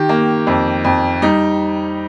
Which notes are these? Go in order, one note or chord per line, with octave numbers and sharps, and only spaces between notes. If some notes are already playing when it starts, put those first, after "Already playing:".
Already playing: D#3 G4
A#3
F2
F2
G3 D#4